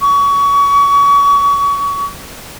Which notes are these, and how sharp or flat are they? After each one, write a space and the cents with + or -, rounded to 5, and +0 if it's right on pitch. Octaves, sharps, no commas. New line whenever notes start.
C#6 +30